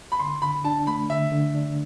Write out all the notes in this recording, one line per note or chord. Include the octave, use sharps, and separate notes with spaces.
B5
D3 C6
D3 B5
D4 A5
A3 B5
D3 E5
D3
D4